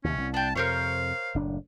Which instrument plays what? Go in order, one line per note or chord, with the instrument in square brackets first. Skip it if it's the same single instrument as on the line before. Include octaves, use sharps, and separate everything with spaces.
[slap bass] D#2 C3 [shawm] C#4
[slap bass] C2
[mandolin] D4 G5 [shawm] A5
[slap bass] F2 C3 [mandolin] A#4 C5 C#5 [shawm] F5
[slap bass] F#1 A2 D4